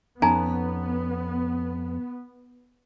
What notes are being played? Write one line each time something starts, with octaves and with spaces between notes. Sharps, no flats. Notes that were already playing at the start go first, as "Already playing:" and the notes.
F2 B3 C#4 D#4 G#5 A#5